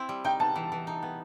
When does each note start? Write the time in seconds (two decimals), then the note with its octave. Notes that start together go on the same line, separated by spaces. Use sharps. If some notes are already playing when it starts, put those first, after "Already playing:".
Already playing: C4 E4
0.09 G3
0.25 D#4 G5
0.40 B3 A5
0.56 E3
0.72 E3
0.87 D#4
1.03 B3